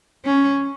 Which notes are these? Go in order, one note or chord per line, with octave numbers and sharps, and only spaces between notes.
C#4